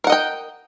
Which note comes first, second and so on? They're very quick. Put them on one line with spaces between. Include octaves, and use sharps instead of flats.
A#4 F#5 D#5 G5